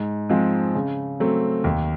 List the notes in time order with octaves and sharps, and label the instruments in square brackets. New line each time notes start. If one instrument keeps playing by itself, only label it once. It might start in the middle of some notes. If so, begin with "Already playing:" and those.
Already playing: [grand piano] G#2
F3 G#3 C4
C#3
F#3 A3 C4
D#2